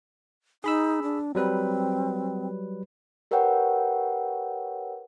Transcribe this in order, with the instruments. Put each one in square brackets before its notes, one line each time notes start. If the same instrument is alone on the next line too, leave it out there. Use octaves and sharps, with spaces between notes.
[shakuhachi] D#4 [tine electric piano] G#4 B5 E6
[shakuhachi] D4
[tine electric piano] F#3 G3 B4 [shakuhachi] C4
[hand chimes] G4 A#4 B4 C#5 F#5 G5